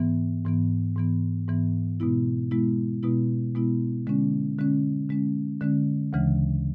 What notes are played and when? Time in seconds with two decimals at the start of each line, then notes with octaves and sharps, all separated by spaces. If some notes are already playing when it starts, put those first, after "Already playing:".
Already playing: G#2 E3 B3
0.45 G#2 E3 B3
0.96 G#2 E3 B3
1.48 G#2 E3 B3
2.00 B2 G#3 B3 E4
2.51 B2 G#3 B3 E4
3.03 B2 G#3 B3 E4
3.55 B2 G#3 B3 E4
4.07 D3 G#3 C#4
4.58 D3 G#3 C#4
5.09 D3 G#3 C#4
5.61 D3 G#3 C#4
6.13 D2 C#3 E3 G#3